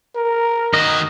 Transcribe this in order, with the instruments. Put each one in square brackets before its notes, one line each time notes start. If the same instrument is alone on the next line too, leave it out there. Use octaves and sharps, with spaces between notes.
[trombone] A#4
[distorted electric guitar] D#3 F#4 [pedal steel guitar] D#5